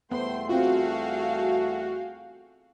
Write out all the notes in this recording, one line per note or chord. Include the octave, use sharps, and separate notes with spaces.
E2 G3 A3 B3 C5 G5 C6
C4 F4 F#4 G#4 F5 G5